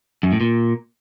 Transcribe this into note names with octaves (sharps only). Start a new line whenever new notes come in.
F#2
A2
A#2